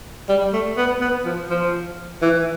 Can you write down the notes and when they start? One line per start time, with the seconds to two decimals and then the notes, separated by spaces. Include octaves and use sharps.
0.29 G3
0.53 A3
0.77 B3
1.01 B3
1.25 F3
1.50 F3
2.22 E3